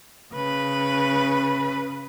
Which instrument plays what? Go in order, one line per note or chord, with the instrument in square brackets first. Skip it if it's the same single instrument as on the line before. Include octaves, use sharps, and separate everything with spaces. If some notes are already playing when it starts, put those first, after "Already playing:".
[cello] C#3 B4